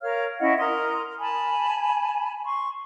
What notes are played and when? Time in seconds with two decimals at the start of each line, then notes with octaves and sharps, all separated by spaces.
0.01 A#4 C#5 F5 F6
0.39 C#4 E4 D#5 F#5
0.59 A#4 A#5 C6 D#6
1.19 G#5 A5 B5
2.44 C6 C#6